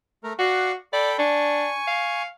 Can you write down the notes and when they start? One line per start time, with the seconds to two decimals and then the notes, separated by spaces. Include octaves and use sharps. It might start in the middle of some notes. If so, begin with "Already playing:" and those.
0.24 A3 A#4
0.39 F#4 D5 F5 F#5
0.93 A4 D5 G5 B5
1.19 D4 G#5 C#6
1.88 F5